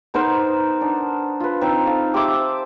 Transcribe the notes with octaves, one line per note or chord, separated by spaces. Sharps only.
B3 D#4 A#4 C5
D4
F4 B4
C4 D#4
A4 F5
G4 C5 E5 D6